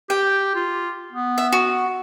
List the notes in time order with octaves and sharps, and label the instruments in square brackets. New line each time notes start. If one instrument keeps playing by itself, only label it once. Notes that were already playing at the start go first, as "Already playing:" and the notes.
[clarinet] G4 [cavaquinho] G5
[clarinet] F4
B3
[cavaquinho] E5
F#4